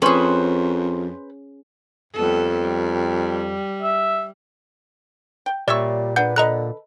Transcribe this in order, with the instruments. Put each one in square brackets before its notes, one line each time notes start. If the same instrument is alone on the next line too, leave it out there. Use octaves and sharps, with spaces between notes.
[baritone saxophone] F2 [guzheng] C#4 G#4 [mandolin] B4 C5 C#6
[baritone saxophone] F2 [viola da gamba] G3 B3 A4
[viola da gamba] G3
[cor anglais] E5
[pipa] G5
[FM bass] A#2 [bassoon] G3 [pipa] C#5 E5 C#6 [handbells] D5 E6
[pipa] D4 G#4 [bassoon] B4 [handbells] F#5 G6
[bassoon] D3 [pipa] A4 B4 [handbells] D#5 A#5 F#6